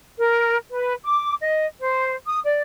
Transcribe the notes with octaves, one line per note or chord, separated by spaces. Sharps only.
A#4
B4
D6
D#5
C5
D#6
D5